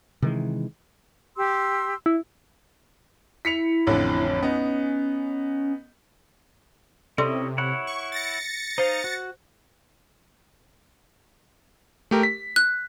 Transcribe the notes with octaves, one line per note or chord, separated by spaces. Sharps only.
C3 D#3 E3 G#3
G4 C6 E6
E4
E4 B6 C#7 F7
A1 F2 D3
B3 C#4 D#4
C3 C#4 E4 A4 D5 D#5 C6
E4 C#5 F#5
C#6
A6 A#6 C#7
D#4 C5 F5
F#4
A3 G4 A#4
B6
F#6